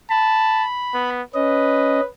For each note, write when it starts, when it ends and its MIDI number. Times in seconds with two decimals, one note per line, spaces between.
0.10 0.65 81
0.10 1.10 83
0.94 1.22 59
1.34 2.01 61
1.34 2.08 71
1.34 2.01 75